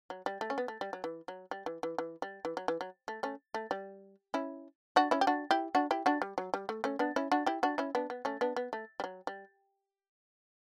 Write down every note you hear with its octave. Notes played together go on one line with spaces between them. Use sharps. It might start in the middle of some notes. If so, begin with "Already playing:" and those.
F#3
G3
A3
C#4
B3
A3
G3
F#3
E3
F#3
G3
E3
E3
E3
G3
E3
F#3
E3
F#3
A3
A3 C#4
A3
G3
C#4 E4
D4 F#4
C#4 E4
G4
D4 F#4
E4 G4
D4 F#4
E4 G4
D4 F#4
G3
F#3
G3
A3
A3 C#4
B3 D4
C#4 E4
D4 F#4
E4 G4
D4 F#4
C#4 E4
B3 D4
B3
A3 C#4
B3 D4
B3
A3
G3
F#3
G3